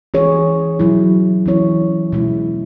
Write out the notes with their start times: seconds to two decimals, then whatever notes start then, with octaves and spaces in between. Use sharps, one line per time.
0.14 E3 C#4 G#4 C#5
0.79 B2 F#3 E4
1.46 E3 C#4 E4 C#5
2.13 B2 G#3 E4